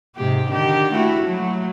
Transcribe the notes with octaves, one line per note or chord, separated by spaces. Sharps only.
G#2 C3 G4
D3 D#3 G4
A3 E4 F#4
F#3 A3